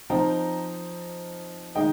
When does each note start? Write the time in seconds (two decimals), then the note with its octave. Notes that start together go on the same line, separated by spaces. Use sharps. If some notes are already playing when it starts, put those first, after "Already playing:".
0.10 F3 C4 D#4 G5 A#5
1.75 D#3 G#3 D#4 D#5 G5